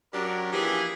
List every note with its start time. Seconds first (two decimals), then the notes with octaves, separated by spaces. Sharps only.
0.14 F#2 F#3 D4 G4 A#4
0.53 E3 F3 A#3 G4 G#4